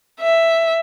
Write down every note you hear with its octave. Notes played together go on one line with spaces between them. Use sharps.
E5